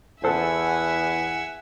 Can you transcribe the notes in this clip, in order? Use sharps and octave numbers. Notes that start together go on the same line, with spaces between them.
E2 A4 C5 E5 F#5 G#5